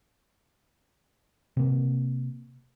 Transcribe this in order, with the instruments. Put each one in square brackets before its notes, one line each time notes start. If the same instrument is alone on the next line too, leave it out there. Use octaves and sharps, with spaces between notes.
[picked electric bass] C3 A#3